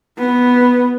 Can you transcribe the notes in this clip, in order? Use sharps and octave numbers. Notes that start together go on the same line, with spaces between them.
B3